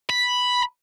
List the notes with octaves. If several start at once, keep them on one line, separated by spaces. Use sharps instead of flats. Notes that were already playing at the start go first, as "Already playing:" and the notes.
B5